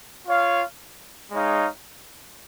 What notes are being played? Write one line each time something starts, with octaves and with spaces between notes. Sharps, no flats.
F4 C#5 F5
G#3 D#4 C#5 F5